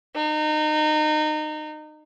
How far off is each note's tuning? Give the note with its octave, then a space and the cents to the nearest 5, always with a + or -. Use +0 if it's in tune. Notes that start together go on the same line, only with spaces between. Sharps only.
D#4 -25